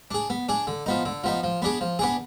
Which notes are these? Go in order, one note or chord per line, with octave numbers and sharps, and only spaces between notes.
D4 G#4
B3
D4 G#4
D3
F3 B3 D#4
D3
F3 B3 D#4
F3
B3 D4 G#4
F3
B3 D4 G#4